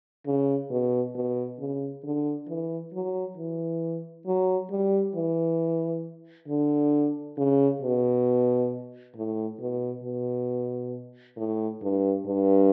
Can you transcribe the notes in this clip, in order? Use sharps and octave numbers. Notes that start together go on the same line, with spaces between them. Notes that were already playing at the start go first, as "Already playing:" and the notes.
C#3
B2
B2
C#3
D3
E3
F#3
E3
F#3
G3
E3
D3
C#3
B2
A2
B2
B2
A2
G2
G2